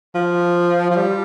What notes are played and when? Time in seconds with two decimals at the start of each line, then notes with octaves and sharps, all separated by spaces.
0.15 F3
0.90 F3
0.96 G3